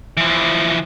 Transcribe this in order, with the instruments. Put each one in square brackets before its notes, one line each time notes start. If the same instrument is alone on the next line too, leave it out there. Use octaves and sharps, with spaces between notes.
[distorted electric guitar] E3 F3